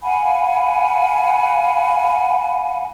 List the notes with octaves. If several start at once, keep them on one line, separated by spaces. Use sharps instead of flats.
F5 F#5 G#5 B5